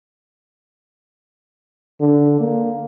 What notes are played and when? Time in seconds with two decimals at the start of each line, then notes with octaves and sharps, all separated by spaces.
2.00 D3
2.40 A#3